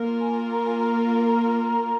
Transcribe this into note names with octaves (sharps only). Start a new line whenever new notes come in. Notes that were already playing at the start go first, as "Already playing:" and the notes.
Already playing: A#3 F4 A#4
G#5
A#5
G#5
A#5